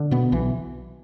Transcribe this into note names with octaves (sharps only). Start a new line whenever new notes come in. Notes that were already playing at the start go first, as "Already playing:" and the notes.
Already playing: D3
B2 B3
B1 E3